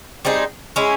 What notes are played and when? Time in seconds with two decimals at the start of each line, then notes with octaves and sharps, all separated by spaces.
0.25 G3 C4 D#4 G#4
0.76 G#3 C#4 E4